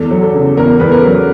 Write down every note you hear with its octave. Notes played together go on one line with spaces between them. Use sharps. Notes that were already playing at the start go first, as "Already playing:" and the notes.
Already playing: E2 A4
F#3
A4
C#3
E2 A#4
E2 B4
A#4
F#3